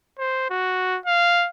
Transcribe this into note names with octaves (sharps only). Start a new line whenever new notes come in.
C5
F#4
F5